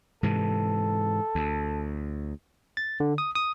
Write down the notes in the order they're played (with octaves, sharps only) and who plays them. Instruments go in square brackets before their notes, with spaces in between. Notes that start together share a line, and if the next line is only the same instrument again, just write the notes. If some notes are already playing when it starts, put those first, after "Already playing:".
[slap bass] G#2 C3 E3 [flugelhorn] A4
[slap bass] D2
[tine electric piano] A6
D3
D#6
D#6